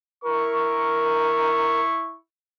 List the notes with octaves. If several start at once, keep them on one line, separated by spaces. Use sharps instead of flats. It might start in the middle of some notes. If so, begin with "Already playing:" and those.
E4 A#4 C#6